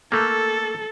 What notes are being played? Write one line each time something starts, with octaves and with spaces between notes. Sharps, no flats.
A3 A#3 A4